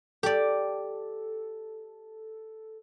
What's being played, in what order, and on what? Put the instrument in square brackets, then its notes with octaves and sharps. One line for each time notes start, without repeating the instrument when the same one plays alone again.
[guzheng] G4 D5 [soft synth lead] A4